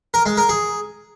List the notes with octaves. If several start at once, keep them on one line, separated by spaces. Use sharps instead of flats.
A#4
G#3
A#4
G#4